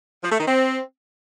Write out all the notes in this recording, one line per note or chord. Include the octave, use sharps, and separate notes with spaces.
F3
A3
D#3
C4